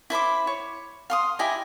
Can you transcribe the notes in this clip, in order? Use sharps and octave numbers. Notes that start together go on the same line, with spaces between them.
E4 C5 B5 D6
C#5
F5 C6 D#6
E4 G4 D#5 G#5